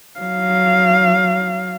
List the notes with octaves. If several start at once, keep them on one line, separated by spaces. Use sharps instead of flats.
F#3 F5